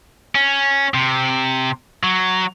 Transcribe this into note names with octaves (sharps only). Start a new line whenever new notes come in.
C#4
C3
F#3